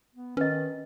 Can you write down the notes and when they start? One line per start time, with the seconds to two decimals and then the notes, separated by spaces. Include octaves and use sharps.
0.15 B3
0.37 D#3 C#4 B4 D#5